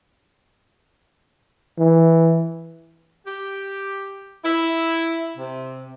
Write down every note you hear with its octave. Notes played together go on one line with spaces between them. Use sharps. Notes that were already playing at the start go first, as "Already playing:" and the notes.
E3
G4
E4
C3